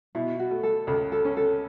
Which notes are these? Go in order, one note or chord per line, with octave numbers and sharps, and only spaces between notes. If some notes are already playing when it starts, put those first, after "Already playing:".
B2 E4
F#4
A3
A4
C#2 A4
A4
C#4
A4